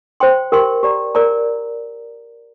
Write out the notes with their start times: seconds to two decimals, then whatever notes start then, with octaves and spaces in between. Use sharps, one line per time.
0.20 C5 G5 C6
0.52 G4 A#4 G5 C6
0.83 G4 D5 A#5
1.15 A#4 D5 A#5